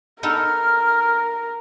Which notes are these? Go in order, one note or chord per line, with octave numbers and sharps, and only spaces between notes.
B3 D#4 A4 A#4 F6